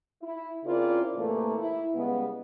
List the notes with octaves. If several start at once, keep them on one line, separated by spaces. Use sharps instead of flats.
E4
C#3 C4 E4 F4 A#4 D5
A2 C3 E3 A3 A#3
E4
C#3 G3 G#3 B3